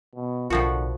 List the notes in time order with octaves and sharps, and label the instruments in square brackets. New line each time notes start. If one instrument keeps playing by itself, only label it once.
[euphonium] B2
[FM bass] B1 [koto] A2 F3 F#4 [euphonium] D3 [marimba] F4 A#4